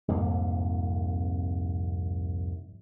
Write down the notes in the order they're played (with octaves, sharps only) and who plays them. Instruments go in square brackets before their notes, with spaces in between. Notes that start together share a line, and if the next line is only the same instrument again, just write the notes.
[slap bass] C2 F2 G#2 A#3